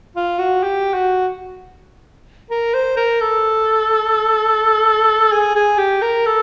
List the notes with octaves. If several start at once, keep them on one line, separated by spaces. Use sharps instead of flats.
F4
F#4
G4
F#4
A#4
C5
A#4
A4
G#4
G#4
G4
A#4
A4